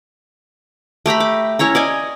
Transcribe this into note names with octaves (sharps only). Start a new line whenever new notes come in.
A3 G4 A#5 B5
D6
C#4 E4 C#5 A#5
D5 D#5 G#5